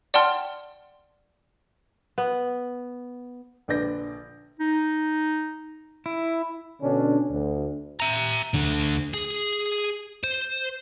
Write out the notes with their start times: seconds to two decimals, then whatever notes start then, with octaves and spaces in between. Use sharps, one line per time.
0.14 D5 F#5 G5 A5 C6 F6
2.18 B3
3.68 A#1 D3 B4 D5 G6 A#6
4.59 D#4
6.06 E4
6.82 B2 D3 C#4 D4
7.31 D2
8.00 E5 A#5
8.54 D2 D3
9.14 G#4
10.24 C5